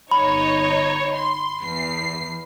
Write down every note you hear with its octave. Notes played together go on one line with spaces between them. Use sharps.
G1 D#4 C#5 B5
C6
E2 C7